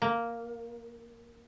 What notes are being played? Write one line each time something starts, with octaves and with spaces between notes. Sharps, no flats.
A#3